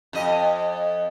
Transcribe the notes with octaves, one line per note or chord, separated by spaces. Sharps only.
F2 D#5